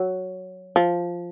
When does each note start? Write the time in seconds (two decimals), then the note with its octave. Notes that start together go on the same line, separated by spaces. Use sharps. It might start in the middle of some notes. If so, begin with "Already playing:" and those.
Already playing: F#3
0.76 F3